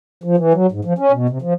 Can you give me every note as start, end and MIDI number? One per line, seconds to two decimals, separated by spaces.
0.24 0.36 53
0.37 0.53 52
0.54 0.67 54
0.72 0.81 44
0.85 0.93 53
0.99 1.12 61
1.12 1.27 47
1.29 1.38 48
1.42 1.54 53